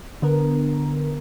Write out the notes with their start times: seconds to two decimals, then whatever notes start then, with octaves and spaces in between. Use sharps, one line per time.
0.22 D3 B3 A#4